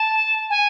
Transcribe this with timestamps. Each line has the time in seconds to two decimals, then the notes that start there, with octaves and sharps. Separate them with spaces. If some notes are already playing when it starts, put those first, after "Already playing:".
Already playing: A5
0.50 G#5